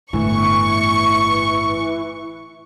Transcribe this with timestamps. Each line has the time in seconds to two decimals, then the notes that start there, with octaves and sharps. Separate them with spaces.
0.13 G1 A2 E3 C#6